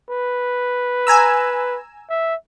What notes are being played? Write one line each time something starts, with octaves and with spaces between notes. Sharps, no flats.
B4
G#5 A#5 E6
E5